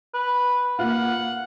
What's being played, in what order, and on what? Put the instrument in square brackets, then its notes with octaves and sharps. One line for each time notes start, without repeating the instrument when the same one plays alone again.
[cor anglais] B4
[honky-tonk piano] A#3 F4 [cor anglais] F#5